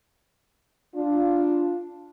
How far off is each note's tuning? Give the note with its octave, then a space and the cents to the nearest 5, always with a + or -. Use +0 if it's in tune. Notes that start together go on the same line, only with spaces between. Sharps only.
D4 +0 F4 +0